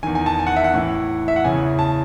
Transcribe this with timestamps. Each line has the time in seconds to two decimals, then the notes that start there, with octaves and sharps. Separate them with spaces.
0.03 E2 D#3 G#5
0.15 G#5
0.26 A5
0.39 G#5
0.47 F#5
0.56 E5
0.64 F#5
0.74 A2 E3
1.28 E5
1.36 F#5
1.44 E2 C#3 E3 G#5
1.79 A5